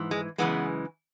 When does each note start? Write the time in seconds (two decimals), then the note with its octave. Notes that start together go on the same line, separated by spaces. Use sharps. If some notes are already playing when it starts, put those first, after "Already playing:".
Already playing: G#2 E3
0.11 G#3
0.38 F#2 C#3 E3 G#3 B3